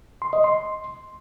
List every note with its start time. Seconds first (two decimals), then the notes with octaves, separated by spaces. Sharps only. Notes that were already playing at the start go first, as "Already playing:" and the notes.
0.22 C6
0.33 D#5
0.44 C6